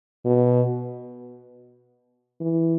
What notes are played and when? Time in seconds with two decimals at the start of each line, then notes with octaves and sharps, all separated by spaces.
0.25 B2
2.41 E3